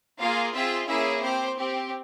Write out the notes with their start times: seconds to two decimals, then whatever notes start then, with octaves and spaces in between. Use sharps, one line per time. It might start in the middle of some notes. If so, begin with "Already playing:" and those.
0.20 A#3 F4 G#4 F5
0.54 C4 F4 G#4 E5
0.88 A#3 C#4 E4 G#4 E5
1.22 C4 G4 C5
1.56 C4 G4